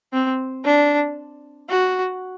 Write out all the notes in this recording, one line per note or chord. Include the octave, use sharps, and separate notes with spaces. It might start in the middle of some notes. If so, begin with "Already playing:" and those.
C4
D4
F#4